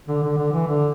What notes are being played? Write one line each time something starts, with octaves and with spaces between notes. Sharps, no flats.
D3
D3
D3
E3
D3